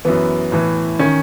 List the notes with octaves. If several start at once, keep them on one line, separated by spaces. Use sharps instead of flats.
F#2 E3 B3
A2 E3
D#3 C#4